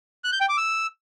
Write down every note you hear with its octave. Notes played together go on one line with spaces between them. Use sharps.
F#6
G6
G5
D6
E6